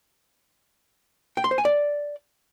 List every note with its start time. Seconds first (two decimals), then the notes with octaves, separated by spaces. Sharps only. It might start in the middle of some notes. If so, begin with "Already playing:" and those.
1.37 G5
1.44 C6
1.51 C5
1.58 G#5
1.65 D5